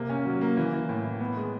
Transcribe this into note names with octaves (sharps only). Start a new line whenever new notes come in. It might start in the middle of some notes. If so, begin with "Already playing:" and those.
Already playing: C3 A#3
C#4
F#3
A#3
E3
E3
A2
E3
B3
G#3